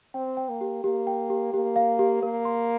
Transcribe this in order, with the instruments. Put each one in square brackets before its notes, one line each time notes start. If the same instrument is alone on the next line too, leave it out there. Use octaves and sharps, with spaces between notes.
[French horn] C4 [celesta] G5
[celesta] G5
[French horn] A#3
[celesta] G4
[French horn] A#3 [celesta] G4
[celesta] G5
G4
[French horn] A#3 [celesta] G4
[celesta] F5
G4
[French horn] A#3 [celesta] A#4
[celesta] C6